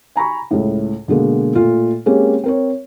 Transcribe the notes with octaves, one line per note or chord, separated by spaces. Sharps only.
G#5 A#5 B5 C#6
C#2 A2
B2 D3 G#3 A#3
A#2 A3 F4
G#3 A#3 C4 C#4 G4 G#4
C4 A#4 C#5